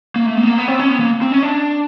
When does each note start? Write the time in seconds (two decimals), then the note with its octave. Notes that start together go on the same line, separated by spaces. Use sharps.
0.16 A#3
0.26 A3
0.37 A#3
0.43 B3
0.48 A#3
0.58 B3
0.68 C4
0.79 C#4
0.90 B3
1.00 A#3
1.21 C4
1.32 C#4
1.43 D4